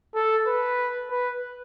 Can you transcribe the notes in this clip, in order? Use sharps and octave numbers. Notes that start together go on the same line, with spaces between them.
A4
B4
B4